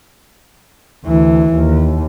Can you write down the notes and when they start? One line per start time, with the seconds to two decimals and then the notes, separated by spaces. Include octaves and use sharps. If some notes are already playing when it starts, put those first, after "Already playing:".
1.05 D2 E3
1.53 D#2